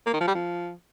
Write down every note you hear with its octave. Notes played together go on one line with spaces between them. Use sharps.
A#3
D#3
F3
G3
F3